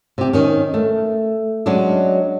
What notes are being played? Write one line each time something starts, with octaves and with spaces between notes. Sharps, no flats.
C3 G4
D#3 C#4
A3
F#3 G#3 C#4 D4